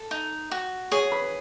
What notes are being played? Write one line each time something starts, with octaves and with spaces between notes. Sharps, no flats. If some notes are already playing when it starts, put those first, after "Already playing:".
Already playing: A4
D#4
F#4
G#4 C#5 C#6
B4 B5